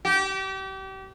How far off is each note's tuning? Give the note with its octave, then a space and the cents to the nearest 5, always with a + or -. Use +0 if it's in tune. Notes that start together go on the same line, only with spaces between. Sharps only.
G4 -30